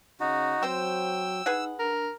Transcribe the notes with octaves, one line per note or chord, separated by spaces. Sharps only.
C#3 D#4 F#4
F#3 C4 C5 G5 E6
D#4 G#4 B4 F#5
D4 A#4